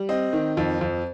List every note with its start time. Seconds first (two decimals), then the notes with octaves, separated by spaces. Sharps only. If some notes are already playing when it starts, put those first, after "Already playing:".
Already playing: G3
0.09 C4 D#5
0.33 D#3
0.57 F2
0.81 F2